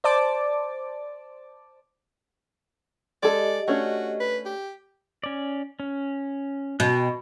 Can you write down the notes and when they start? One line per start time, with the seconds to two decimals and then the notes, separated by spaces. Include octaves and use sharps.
0.04 C5 D5 A5 D6
3.23 G#3 G4 A4 D5 D#5
3.68 A3 C#4 D4 F#4
4.20 B4
4.45 G4
5.23 C#4 D5
5.80 C#4
6.80 B2 G5 F#6